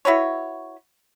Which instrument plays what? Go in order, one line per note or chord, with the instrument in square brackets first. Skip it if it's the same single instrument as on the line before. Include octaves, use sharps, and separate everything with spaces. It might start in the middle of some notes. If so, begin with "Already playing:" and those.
[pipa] E4 F#4 B4 C#5